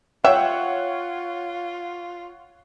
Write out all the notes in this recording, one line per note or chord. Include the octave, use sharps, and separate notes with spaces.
F4 C#5 E5 F#5 G5